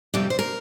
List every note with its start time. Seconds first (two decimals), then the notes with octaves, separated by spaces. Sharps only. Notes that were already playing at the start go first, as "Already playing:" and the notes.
0.14 F2 C3 G3 G4
0.30 C5
0.39 A#4